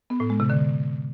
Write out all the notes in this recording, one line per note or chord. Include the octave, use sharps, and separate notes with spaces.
B3
A2
G#3
C3
D3